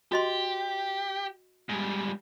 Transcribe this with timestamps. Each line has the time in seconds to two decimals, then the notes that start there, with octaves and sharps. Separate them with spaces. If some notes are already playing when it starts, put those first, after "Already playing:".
0.12 F#4 G4 D#5 C6
1.69 G#2 G3